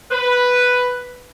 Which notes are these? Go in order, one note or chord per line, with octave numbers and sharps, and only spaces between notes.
B4